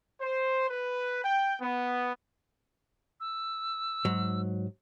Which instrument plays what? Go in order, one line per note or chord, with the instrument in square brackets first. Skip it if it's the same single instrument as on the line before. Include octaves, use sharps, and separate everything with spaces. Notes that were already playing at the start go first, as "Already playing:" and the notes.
[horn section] C5
B4
G5
B3
[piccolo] E6
[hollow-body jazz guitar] G#2 F#3